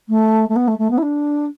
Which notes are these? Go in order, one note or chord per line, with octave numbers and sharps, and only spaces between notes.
A3
A3
B3
A3
A3
B3
E4
D4